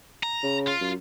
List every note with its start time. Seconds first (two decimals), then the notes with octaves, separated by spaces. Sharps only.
0.23 A#5
0.43 C#3
0.67 F4
0.81 F#2